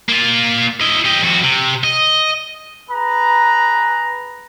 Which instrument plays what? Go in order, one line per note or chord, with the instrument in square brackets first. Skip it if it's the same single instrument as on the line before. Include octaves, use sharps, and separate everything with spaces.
[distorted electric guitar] A#3 F4
E4 D#5
G4 D#5
F2 F#4
C3
D#5
[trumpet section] G#4 B4 A#5